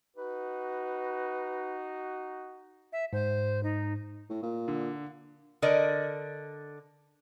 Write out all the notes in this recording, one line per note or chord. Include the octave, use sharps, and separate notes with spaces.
D#4 F#4 B4
E5
G#2 C5
D#4
A2
A#2
D3
D3 A#4 D5 D#5